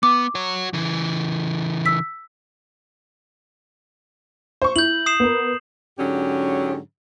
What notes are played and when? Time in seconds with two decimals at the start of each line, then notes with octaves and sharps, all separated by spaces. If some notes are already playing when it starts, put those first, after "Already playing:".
0.03 B3 D6
0.35 F#4 C#5
0.73 C#3 E3
1.86 E6 B6
4.62 C5 C#6
4.76 E4 G6 F#7
5.06 D#6 C7 E7
5.20 B3 A#4
5.99 G#2 D3 F#3 C#4 G4